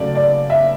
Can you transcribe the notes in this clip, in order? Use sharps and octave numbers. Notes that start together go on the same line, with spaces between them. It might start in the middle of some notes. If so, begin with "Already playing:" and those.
Already playing: C#3 F#3 A3 D5
D5
E5